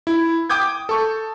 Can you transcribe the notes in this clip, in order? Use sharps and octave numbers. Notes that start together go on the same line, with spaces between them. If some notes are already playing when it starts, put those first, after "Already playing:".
E4
G5 D6 D#6 G6 G#6
A4 C#6